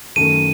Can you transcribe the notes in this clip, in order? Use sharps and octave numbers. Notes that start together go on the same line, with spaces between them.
F#2 D#3 A3 D#7